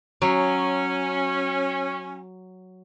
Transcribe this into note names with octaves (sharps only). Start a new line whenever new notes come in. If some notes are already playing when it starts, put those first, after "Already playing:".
F#3 C#4